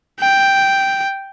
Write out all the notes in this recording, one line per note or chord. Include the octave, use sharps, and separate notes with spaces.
G5